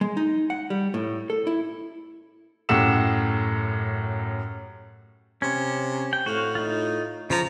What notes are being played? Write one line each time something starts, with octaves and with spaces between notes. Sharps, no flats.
G#3
D#4
F#5
G3
A2
A4
E4
F#2 A2 G4 F#5 E6 E7
C3 C#4
G5
A2 F#4 F5
D#4 F4
C#3 F3 A#5